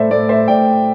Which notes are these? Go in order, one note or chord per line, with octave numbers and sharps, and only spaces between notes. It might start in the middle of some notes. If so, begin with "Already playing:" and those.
Already playing: A2 A4 C5 D5 E5
A2 A4 D5
C5 E5
A2 D5 G5